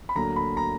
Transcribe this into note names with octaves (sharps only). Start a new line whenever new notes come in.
B5
D2 D3 F#3 A#3 A#5
B5
A#5